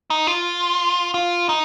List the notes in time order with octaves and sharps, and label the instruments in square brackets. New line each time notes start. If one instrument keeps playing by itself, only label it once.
[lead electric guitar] D#4
F4
F4
D#4